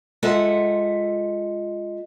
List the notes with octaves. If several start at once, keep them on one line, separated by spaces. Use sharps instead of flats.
G#3 F4 A4 E5 F#5